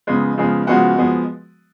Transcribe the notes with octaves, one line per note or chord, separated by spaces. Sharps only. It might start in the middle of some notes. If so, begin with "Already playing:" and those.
C#3 F3 G#3 B3
C#3 F3 G#3 B3
C#3 F3 G#3 B3 F#4 F#5
F3 G#3 B3